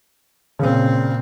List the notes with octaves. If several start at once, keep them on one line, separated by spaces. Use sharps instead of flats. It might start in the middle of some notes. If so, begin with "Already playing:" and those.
A#2 C#3 C4